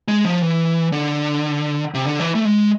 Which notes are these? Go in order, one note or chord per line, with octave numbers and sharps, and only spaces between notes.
G#3
F3
E3
D3
C3
D3
E3
A3
G#3